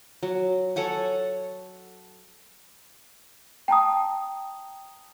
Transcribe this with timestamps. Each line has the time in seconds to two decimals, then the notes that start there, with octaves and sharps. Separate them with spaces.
0.23 F#3
0.76 A4 C#5 F#5 G#5
3.68 G5 A5 A#5 D#6